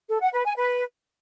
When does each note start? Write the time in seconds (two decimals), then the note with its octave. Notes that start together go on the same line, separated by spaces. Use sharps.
0.08 A4
0.20 F#5
0.32 B4
0.44 G#5
0.56 B4